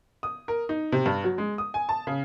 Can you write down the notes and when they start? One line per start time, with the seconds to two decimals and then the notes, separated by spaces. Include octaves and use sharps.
0.23 D#6
0.48 A#4
0.69 D#4
0.92 C3
1.06 G2
1.24 F#3
1.38 G#3
1.58 D#6
1.74 G#5
1.89 A5
2.07 C#3